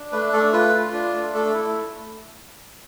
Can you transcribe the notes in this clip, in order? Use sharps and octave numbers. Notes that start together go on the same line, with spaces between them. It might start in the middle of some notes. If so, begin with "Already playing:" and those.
Already playing: D4
A3 B4
A3 A4
F4 B4
F4
D4
A3
A3 A4
E4
A3